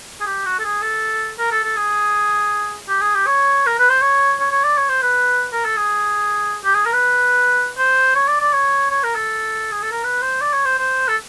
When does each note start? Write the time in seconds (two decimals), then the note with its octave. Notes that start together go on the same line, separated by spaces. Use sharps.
0.21 G#4
0.27 G4
0.46 F#4
0.59 A4
0.64 G#4
0.82 A4
1.39 A#4
1.51 A4
1.64 A4
1.77 G#4
2.89 G4
3.01 G#4
3.15 G4
3.27 C#5
3.66 A#4
3.79 B4
3.90 C5
4.01 C#5
4.40 C#5
4.52 C#5
4.64 D5
4.78 C#5
4.89 C5
5.02 B4
5.52 A#4
5.65 A4
5.77 G#4
6.64 G4
6.74 G#4
6.86 A#4
6.93 B4
7.78 C5
8.15 C#5
8.28 D5
8.40 D5
8.54 C#5
8.91 C#5
9.03 A#4
9.15 A4
9.72 G#4
9.82 A4
9.92 A#4
10.04 B4
10.22 C5
10.41 D5
10.53 C#5
10.65 C5
10.79 C5
11.08 A4